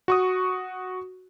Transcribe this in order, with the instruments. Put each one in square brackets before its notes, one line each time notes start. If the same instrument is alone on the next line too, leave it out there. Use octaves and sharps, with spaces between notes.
[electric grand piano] F#4 C#6 D#6